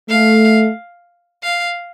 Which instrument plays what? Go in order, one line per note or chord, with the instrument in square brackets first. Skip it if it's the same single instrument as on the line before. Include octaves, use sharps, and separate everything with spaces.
[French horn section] A3 [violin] F5
[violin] F5